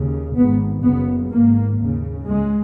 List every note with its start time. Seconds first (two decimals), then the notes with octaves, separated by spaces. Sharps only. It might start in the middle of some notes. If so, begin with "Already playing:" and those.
Already playing: D#2 C#3
0.36 G#1 G#2 B3
0.83 F#1 F#2 C#3 B3
1.31 G#1 G#2 A#3
1.79 D#2 C#3
2.27 C#2 C#3 G#3